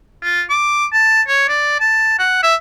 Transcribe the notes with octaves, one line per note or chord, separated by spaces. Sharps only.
F4
D6
A5
C#5
D5
A5
F#5
E5